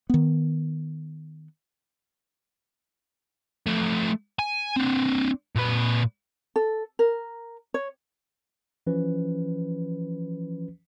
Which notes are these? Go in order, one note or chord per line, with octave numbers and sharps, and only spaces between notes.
D#3 B3
F3 A3
G#5
C4 D4
A#2 B4
A4
A#4
C#5
E3 F3 C#4 B4